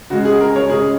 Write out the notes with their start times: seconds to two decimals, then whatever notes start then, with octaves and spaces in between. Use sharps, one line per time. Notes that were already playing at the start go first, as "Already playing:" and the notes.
0.10 C#3 G#3 F#4
0.25 G#4
0.41 A#4
0.56 C#5
0.70 C#3 G#3 G#4